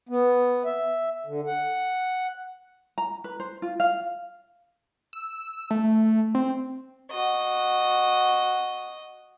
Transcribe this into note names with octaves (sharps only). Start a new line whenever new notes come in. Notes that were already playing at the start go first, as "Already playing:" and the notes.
B3
E5
D3
F#5
A#5
B4
C5
F4
F5
E6
A3
C4
F#4 D#5